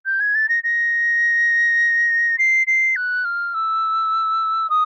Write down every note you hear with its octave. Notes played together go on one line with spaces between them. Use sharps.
G6
G#6
A6
A#6
A#6
C7
C7
F#6
F6
E6
D#6